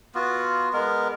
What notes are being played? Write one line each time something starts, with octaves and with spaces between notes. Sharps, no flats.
B3 F4 F#4
G#3 B3 A#4